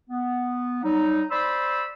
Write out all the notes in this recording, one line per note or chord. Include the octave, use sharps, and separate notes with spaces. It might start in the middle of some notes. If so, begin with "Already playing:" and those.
B3
F#3 G3 D#4
C5 D5 B5 C6 E6